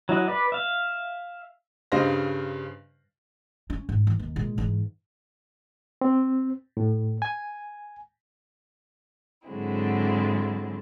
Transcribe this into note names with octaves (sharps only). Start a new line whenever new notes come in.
F#3 E4 D#5 F#5
B4 D5
E5 F5
G2 C#3 C5 D#5 F5 A#6
C#4
G#2
E3
D#2
A#2 G#3
G#2 E3
C4
A2
G#5
G#2 D3 F#3 G#3 C4 E4